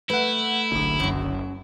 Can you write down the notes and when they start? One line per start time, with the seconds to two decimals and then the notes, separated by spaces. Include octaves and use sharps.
0.10 A3 E4 B4 F#5
0.72 F#1 B1 D3
1.00 F#2 F#3